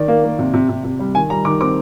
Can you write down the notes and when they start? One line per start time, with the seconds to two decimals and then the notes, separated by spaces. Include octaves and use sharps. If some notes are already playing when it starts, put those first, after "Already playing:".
Already playing: D#3 D5
0.08 A#3
0.23 A#3
0.38 C3
0.54 C3
0.69 C3
0.84 C3
0.99 G3
1.14 D#3 G#5
1.30 G3 A#5
1.45 D#3 D6
1.60 C4 D6